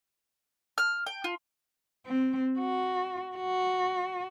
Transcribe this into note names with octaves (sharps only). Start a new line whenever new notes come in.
F6
G5
F4
C4
F#4
F#4